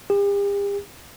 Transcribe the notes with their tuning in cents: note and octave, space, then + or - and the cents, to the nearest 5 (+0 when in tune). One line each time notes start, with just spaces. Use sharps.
G4 +45